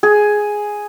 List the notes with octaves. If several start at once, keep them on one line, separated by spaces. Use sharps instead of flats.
G#4